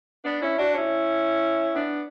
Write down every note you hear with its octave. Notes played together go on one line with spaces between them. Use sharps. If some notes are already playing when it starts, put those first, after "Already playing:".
B3 D4
C#4 E4
D4 F#4
C#4 E4
B3 D4